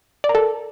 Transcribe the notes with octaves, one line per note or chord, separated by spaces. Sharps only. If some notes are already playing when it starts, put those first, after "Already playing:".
D5
A#4
A4